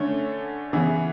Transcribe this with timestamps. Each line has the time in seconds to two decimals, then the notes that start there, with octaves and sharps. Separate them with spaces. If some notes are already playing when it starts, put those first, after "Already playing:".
Already playing: D3 A3 C#4
0.73 C#3 E3 B3 E4 G#4